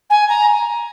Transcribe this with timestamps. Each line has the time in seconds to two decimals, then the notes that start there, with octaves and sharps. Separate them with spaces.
0.10 G#5
0.28 A#5